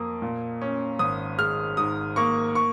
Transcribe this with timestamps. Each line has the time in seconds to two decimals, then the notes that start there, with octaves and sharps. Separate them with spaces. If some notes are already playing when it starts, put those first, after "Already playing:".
Already playing: F2 A#3 D#6
0.22 A#2
0.62 C#4
0.99 G#1 D#6
1.38 G#3 F6
1.77 G#2 D#6
2.16 A#3 C#6
2.55 C#6